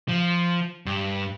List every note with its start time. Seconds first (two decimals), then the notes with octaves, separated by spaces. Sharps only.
0.08 F3
0.86 G2